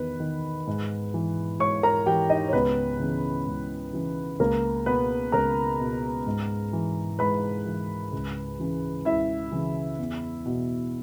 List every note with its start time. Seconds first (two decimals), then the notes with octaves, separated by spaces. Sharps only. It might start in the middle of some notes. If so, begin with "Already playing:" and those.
Already playing: E2 D#3 B4
0.20 D#3
0.67 G#2
1.14 E3
1.59 G#2 C#5 C#6
1.83 A#4 A#5
2.06 E3 G4 G5
2.29 D#4 D#5
2.48 C#5
2.53 C#2 B3 B4
3.00 C#3 E3
3.47 C#2
3.93 C#3 E3
4.40 C#2 A#3 A#4
4.86 B2 B3 B4
5.32 C#2 A#4 A#5
5.80 B2
6.27 G#2
6.73 E3
7.19 G#2 B4 B5
7.66 E3
8.13 C#2
8.60 C#3 E3
9.05 C#2 E4 E5
9.52 C#3 E3
9.98 E2
10.46 B2